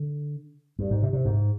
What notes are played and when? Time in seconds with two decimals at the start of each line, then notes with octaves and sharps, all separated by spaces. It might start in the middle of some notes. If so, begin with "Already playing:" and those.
Already playing: D3
0.79 G2
0.91 G#2
1.02 C3
1.13 C3
1.25 G#2